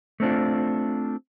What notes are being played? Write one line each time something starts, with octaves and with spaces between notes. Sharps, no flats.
A3 C4 D4 F4